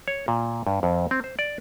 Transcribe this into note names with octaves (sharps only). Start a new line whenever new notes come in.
C#5
A#2
G2
F2
C4
C5
D5